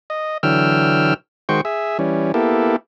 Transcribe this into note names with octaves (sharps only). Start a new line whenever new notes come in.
D#5
D3 E3 F#3 G5 E6 F6
D#3 G#3 F#4 C5 G5 C#6
G#4 E5
E3 G3 C#4
A#3 B3 E4 G4 A4